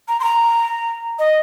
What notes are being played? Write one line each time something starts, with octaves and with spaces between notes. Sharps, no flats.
A#5
C6
A#5
D#5